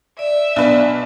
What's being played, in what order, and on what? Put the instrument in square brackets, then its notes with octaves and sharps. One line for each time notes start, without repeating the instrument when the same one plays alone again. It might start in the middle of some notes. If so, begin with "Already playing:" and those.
[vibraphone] D5 [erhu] E5
[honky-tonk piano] B1 B4 [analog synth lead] D4